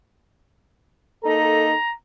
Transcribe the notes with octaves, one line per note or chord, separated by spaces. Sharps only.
A#3 D#4 A4 A#5